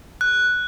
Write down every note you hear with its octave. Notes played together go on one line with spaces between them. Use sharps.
F#6